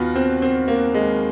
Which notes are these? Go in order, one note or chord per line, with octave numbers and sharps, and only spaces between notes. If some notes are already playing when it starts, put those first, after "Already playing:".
Already playing: D#2 B3 F4 F#4
C4
C4
A#3
G#3